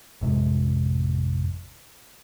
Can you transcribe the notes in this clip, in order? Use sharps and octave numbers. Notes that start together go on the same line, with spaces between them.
A1 F2 C3 G#3